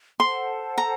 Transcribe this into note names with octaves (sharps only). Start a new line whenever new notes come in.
A4 C5 F#5 A5 C6
A#5